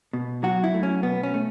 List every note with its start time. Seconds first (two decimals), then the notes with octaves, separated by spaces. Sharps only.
0.13 B2
0.43 F#3 F#4
0.64 E4
0.74 A3
0.83 C#4
1.03 B2 B3
1.23 C#4
1.34 A3